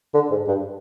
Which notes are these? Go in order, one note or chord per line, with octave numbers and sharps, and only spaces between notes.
D3
G#2
G2